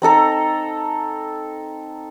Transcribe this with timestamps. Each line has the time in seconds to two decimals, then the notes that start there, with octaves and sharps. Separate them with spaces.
0.02 C4 D#4 A4 A#5